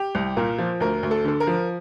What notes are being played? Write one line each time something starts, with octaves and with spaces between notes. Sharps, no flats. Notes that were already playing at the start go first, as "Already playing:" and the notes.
Already playing: G4
C2
A#2 A#4
F3
D2 A#4
D2
A4
D3 A4
A#4
F3